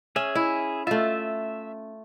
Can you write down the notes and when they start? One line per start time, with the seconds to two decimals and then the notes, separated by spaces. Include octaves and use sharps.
0.16 C#4 G#4 E5
0.35 E4
0.87 A3 F4 E5